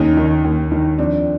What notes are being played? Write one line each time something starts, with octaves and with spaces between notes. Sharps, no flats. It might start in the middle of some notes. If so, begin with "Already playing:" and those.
Already playing: D#2 C#4 D#4
D#3
D#2
D#3
F2 C4 D4